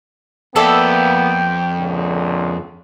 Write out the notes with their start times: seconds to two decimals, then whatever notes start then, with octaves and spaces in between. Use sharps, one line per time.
0.56 F2 A#3 B3 A4 D5 E5 G5
1.79 C#2 A#2 D3